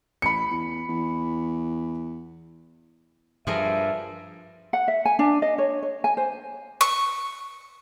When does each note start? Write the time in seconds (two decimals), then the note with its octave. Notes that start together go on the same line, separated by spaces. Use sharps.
0.22 A1 B5 C#7
0.51 E2
0.89 E2
3.47 G2 F3 G#4 A#4 E5
4.73 F#5
4.88 E5
5.05 G#5
5.19 D4
5.42 D#5
5.58 C#5
5.82 C#5
6.04 G#5
6.17 C5
6.81 C#6